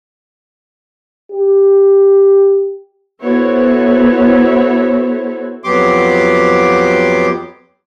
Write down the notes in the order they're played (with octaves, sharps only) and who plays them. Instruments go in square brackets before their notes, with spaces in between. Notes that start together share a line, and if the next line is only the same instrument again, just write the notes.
[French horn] G4
[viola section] B3 E4 F#4 A4 C5 C#5
[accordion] F2 F#3 B3 G4 C6 D6